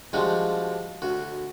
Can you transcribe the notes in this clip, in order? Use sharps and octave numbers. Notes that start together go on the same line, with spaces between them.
F3 G3 G#3 D4 F#4
D2 F#4